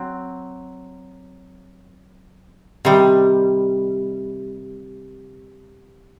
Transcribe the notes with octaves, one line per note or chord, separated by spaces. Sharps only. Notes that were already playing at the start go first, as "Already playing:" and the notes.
Already playing: F#3 C4
C3 D#3 G3